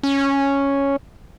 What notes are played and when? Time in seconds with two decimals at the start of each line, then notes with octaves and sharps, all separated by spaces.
0.03 C#4